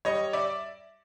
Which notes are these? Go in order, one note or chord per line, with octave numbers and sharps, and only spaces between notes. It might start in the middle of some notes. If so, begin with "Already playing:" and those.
G3 C#5 D#5
D5 E5